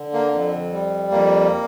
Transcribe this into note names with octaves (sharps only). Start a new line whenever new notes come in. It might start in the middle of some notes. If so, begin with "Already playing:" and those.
Already playing: D3
A#3
F2
G3
F2 A#3